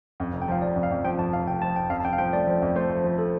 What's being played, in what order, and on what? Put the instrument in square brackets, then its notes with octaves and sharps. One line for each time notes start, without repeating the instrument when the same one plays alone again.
[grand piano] F2
F1
[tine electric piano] G5
[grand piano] F3 [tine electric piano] F5
[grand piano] F1 [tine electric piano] D5
[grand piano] F2
[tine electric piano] F5
[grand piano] F2
[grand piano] F3 [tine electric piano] G5
[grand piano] F2 [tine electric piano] A5
[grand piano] F1 [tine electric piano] F5
[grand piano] F1 [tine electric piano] G5
[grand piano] F3 [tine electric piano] A5
[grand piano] F1 [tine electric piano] G5
[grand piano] F2 [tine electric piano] F5
[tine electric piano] A5
[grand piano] F2 [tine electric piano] G5
[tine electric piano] F5
[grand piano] F3 [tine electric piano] G5
[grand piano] A3 [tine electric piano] D5
[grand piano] F3
F2
[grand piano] A3 [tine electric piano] C5
[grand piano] F3
F3
[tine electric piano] A4